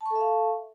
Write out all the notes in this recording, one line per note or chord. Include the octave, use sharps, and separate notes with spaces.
A4 E5 F5 A5 C#6